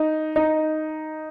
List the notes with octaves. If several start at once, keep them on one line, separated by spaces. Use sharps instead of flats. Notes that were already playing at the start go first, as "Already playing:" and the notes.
Already playing: D#4
D#4